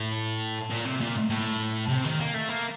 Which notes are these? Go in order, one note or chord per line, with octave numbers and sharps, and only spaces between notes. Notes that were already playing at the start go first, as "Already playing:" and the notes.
Already playing: A2
A#2
C3
A#2
A2
C3
D#3
A#3
A3
A#3